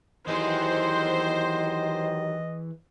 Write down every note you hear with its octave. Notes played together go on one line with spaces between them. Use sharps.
D#3 E3 F#3 G4 G#4 C5 D#5